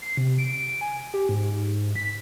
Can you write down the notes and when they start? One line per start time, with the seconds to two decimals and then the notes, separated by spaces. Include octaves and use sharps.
0.02 C7
0.17 C3
0.38 D7
0.81 G#5
1.14 G4
1.29 G#2
1.96 B6